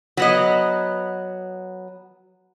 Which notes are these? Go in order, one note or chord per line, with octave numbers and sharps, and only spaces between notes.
F#3 B3 D#5